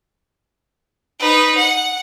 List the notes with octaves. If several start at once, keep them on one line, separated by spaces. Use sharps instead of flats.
D#4 B4
F#5